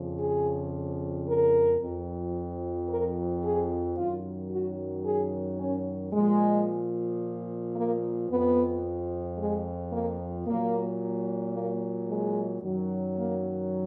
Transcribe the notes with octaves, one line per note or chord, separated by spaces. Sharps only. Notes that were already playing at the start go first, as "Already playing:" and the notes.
Already playing: F2 C#3 F3
G#4
A#4
F2 F3
A#4
G#4
F#2 D#3 F#3 F4
F#4
G#4
C#4
A#2 F3 G#3
A#3
F2 F3 B3
G#3
A#3
A#2 F#3 A#3
A#3
G#3
F#2 D#3 F#3
A#3